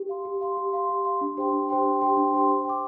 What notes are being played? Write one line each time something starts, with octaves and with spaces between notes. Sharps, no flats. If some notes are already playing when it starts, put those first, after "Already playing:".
Already playing: G4
F5 C6
G4
F5 C6
G4
F5 C6
G4
F5 C6
D4
G4 C5 G5 C6
D4
G4 C5 G5 C6
D4
G4 C5 G5 C6
D4
G4 C5 G5 C6
C5
G5 D6